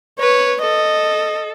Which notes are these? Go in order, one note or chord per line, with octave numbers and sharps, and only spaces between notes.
B4 C#5
A4 D#5